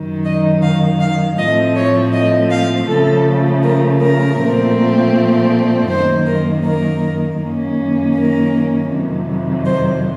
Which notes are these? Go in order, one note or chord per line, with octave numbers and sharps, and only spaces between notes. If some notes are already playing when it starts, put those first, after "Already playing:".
Already playing: F#2 D#3 F#3
D#5
F5
F5
A2 F3 A3 C4 D#5
C#5
D#5
F5
C#3 F3 A3 A4
A#4
A#4
A#2 F3 A3 C4
F#2 D#3 A#3 C5
A#4
A#4
F#2 D#3 A#3 C#4
A#4
F2 C3 D#3 F#3
C5